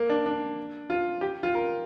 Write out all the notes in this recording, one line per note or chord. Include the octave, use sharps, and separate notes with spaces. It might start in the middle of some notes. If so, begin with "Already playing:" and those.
Already playing: A#3
D4
D4
F4
G4
F4
A#4